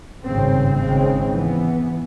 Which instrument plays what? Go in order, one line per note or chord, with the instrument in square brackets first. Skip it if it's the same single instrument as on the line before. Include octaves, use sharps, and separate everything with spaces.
[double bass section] G#1 G2 C#3 C4
G#1 C#3 G#3 C4
E3 B3